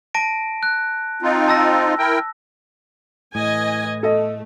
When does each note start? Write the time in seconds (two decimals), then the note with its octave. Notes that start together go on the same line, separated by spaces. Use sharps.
0.14 A5 A#6 D7
0.63 F#6
1.22 C4 D#4 F4
1.48 A5 E6 A#6
1.98 E4 A#4 G5
3.35 A2 E3 D#5 G#5
4.03 A3 A4 D#5